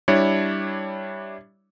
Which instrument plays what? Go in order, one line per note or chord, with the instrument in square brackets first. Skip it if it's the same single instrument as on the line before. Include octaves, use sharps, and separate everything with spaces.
[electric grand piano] G3 D4 E4 C#5